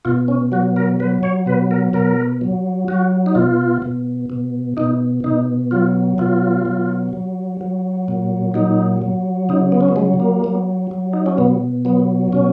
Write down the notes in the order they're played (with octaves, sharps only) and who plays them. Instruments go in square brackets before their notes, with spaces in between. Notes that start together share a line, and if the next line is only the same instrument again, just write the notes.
[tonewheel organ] B2 F4
C#4
F#3 F#4
A#4
F#3 B4
C#5
B2 B4
A#4
B2 A#4
F#3
F#3 F#4
D#4
B2 F4
B2
B2
B2 D#4
B2 D#4
F#3 F4
B2 F4
F#3
F#3
F#3
A#2
F#3 D#4
F#3
C#3 D#4
B3
C#4
B3
F#3 G#3
A#3
F#3
F#3
D#4
C#4
B2 B3
F#3 B3
B2 C#4